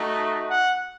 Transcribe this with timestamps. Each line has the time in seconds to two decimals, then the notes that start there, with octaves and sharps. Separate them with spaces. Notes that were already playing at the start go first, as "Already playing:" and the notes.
Already playing: A3 D#4 F#4
0.49 F#5